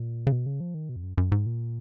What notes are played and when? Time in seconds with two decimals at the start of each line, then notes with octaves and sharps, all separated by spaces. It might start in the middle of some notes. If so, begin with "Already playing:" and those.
Already playing: A#2
0.27 C#3
0.32 B2
0.46 C#3
0.60 F3
0.74 D#3
0.89 B2
0.96 F2
1.03 F#2
1.18 F#2
1.32 G#2
1.46 A#2